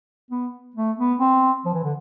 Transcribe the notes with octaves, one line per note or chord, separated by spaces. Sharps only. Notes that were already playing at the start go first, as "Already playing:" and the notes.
B3
A3
B3
C4
F3
E3
D3